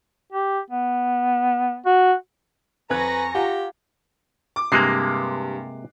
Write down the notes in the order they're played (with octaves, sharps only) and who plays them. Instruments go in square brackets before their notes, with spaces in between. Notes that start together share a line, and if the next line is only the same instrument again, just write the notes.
[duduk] G4
B3
F#4
[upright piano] F2 F#6 G#6 [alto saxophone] B4 [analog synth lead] G#5 [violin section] A#5 C#6 A#6
[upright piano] F4 F#5 [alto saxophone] G4
[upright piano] D6
[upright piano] G2 F#6 C7 [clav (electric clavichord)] C3 G#3 A#3